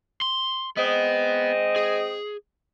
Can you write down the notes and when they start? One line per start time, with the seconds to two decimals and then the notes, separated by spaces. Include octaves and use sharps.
0.21 C6
0.77 G#3 B3 C4 D#5
1.76 G#4